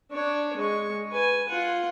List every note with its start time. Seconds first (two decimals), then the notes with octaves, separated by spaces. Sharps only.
0.11 D4 C#5
0.57 G#3 C#6
1.11 B4 G#5
1.48 F4 F#5